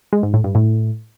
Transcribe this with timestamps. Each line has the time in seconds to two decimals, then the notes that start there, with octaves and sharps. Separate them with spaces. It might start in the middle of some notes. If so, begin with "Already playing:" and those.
0.13 G#3
0.23 G#2
0.34 A2
0.44 G2
0.55 A2